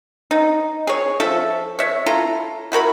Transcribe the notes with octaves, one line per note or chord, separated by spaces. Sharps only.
D#4
G#4 C#5
F3 A4 E5
C#5 E5
E4 F4 A4 A#5
E4 F#4 A#4 B5